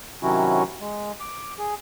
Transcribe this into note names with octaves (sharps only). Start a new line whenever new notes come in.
C3 D#3 F#3 C#4 E4 F#4
G#3
D6
G#4